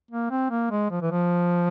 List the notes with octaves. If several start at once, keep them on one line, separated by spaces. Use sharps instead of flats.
A#3
C4
A#3
G#3
F3
E3
F3